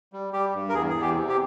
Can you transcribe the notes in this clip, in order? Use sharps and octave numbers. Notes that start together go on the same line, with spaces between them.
G3
G3 G4
G2
A#4
E2 G#4
E2 G#4
G4
C3
G4